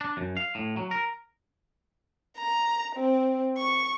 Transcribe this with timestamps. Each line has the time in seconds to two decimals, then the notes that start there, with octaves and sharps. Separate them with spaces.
0.01 D4
0.17 F#2
0.37 F5
0.55 A2
0.77 F#3
0.91 A#4
2.37 A#5
2.96 C4
3.58 C#6